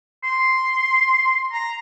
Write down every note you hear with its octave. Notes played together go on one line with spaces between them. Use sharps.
C6
A#5